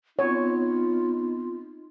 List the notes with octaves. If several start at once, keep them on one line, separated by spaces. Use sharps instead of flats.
B3 C4 D#4 F4 C#5